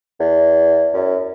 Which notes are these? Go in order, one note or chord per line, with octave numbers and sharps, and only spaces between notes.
E2
F#2